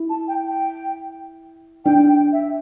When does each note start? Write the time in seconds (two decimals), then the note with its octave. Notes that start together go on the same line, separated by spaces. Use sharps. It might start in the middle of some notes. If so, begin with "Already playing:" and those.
Already playing: E4
0.10 A5
0.28 G5
0.45 G5
1.85 D4 G5
2.08 G5
2.32 E5